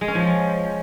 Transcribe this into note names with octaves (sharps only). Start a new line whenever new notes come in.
G#3
C#4
F3